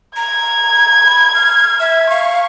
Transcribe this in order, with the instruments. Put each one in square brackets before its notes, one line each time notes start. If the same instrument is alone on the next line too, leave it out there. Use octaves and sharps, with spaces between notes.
[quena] A#5 [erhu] G#6
[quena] B5
F6
E5
[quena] F5 [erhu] C#6